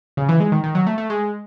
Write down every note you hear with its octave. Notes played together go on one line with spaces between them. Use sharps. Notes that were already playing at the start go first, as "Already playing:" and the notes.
C#3
E3
G#3
D#3
D#3
F#3
A3
A3
G#3